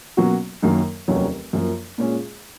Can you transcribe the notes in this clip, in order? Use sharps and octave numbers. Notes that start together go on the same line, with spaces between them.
B2 F#3 A#3 C#4 F#4
F#2 D#3 F#3 A#3
F1 D#2 D#3 F#3 C#4
F#2 F3 A#3
A#2 G#3 C#4 G#4